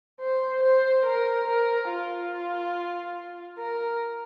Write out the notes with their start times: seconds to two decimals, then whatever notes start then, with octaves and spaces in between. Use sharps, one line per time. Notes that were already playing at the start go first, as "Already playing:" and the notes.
0.21 C5
0.63 C5
1.06 A#4
1.47 A#4
1.90 F4
3.59 A#4